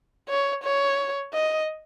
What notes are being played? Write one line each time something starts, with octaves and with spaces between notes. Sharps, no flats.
C#5
C#5
D#5